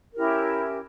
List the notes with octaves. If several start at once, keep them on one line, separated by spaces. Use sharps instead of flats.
C#4 E4 G4 A#4